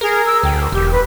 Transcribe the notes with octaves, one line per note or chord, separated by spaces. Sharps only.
G#4 A#4
E6
D2 G5
E1 G4
B4